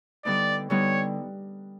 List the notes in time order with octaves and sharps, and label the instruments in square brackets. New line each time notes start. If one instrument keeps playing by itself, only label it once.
[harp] D3 G3 B3 D#4 [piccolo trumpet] D5
[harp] D3 G3 B3 D#4 [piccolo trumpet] C#5